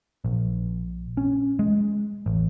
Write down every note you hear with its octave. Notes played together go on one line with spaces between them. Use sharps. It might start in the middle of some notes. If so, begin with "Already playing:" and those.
A#1
C#4
G#3
A1